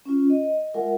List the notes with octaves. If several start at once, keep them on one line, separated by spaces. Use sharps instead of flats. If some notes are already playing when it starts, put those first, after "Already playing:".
C#4 F4
D#5
G#3 F4 A#4 E5 F#5